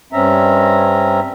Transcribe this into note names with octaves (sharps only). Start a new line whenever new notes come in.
G2 C4 C#4 E5 A#5